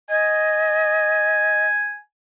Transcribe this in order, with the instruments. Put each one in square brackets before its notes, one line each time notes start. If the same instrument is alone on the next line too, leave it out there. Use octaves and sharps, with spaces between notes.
[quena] D#5 [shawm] G#5